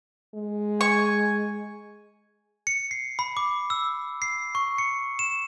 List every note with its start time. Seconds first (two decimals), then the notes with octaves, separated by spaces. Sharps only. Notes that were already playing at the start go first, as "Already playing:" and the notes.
0.35 G#3
0.81 G#5 C#6
2.67 C#7
2.91 C7
3.19 B5
3.37 D6
3.70 E6
4.22 C7
4.55 C#6
4.78 C#7
5.19 E7